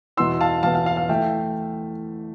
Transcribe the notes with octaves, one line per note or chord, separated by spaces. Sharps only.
E2 B2 B3 E4 C6 E6
F5 A5
E2 B2 B3 E4 F5 A5
F5
F5
F5
E3 A3 E4 E5 G5